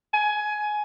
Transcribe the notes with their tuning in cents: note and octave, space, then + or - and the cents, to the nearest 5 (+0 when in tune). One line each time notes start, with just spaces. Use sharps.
G#5 +15